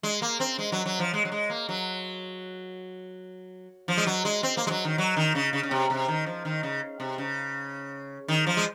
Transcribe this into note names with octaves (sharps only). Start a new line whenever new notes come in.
G#3
A#3
C4
G#3
F#3
F#3
F3
G#3
F#3
G#3
A#3
F#3
F3
G#3
F#3
G#3
C4
A#3
G#3
F#3
D#3
F#3
D#3
C#3
C#3
C#3
C3
C3
D#3
F3
D#3
C#3
C3
C#3
D#3
F3
G#3